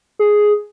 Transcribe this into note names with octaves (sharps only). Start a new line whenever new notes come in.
G#4